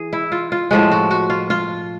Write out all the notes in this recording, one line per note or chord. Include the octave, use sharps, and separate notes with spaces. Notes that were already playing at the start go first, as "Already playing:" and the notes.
Already playing: E3 G#4
E4
F4
F4
A2 F3 G#3 F#4
F#4
F#4
F4
F4